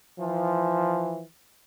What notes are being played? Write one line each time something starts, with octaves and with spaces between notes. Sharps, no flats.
E3 F3